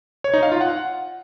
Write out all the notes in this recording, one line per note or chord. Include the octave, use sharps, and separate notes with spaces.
C#5
D#4
F5
F4
F#5